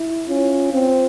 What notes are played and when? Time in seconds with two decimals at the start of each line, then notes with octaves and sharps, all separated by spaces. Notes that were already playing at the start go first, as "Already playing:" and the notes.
Already playing: E4
0.28 C#4 F4
0.73 C4 F4